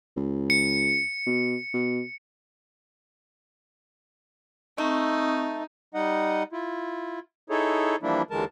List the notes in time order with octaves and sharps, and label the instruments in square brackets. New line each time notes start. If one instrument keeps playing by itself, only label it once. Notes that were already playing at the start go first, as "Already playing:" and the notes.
[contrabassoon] C#2
[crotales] C#7
[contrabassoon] B2
B2
[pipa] A3 [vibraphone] C4 C#6 D#6 [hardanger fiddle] D#4
[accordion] G3 D#4 D#5 F#5
E4 F4
D#4 E4 G#4 A4 C#5
E3 F3 G3 A#3 D4 E4
D#2 D3 E3 G#3 A#4 A5